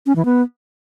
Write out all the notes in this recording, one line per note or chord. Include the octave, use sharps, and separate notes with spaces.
C#4
E3
B3